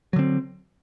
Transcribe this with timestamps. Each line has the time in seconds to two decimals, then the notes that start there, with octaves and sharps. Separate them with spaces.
0.13 F#3
0.16 D3
0.19 C4